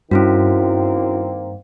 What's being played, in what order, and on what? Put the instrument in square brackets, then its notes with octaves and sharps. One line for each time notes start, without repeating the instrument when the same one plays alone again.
[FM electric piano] G2 [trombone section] D#3 A#3 C4 [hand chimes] C#4 E4 F#4